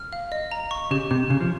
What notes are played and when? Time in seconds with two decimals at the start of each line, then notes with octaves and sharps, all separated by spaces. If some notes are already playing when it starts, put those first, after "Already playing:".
Already playing: F6
0.13 F5
0.32 D#5
0.51 A#5
0.71 C#6
0.91 C#3 G4
1.11 C3 G4
1.30 C#3 G4
1.41 F3